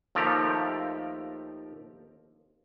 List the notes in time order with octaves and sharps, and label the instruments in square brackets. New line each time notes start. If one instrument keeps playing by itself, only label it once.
[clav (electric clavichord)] D#2 F3 A3 G4 A#5